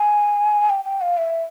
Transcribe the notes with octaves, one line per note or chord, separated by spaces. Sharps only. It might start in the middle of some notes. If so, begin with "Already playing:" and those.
Already playing: G#5
G5
G5
F5
E5